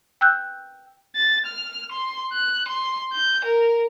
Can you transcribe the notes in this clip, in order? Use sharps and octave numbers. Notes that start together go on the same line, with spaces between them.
G5 E6 F#6 G6
A6
F6
C6
F#6
C6
G6
A#4